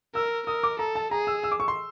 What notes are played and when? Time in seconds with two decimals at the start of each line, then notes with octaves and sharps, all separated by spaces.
0.15 A#4 E6
0.47 A#4 D#6
0.63 D6
0.79 A4 A#5
0.95 A5
1.11 G#4 A#5
1.27 E6
1.44 E6
1.52 D6
1.60 C#6
1.68 C6